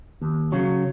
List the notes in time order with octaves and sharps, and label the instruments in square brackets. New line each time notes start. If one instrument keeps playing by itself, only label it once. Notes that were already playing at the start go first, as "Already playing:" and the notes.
[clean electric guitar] D#2
C#3 F#3